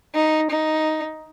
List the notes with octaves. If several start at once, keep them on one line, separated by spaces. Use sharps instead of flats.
D#4
D#4